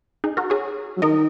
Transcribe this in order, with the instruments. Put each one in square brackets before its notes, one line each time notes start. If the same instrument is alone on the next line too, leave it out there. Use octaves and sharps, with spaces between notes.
[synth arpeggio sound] D#4 G#4
F#4 A#4
G#4 C#5
[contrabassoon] F#3
[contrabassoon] D#3 [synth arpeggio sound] A#4 D#5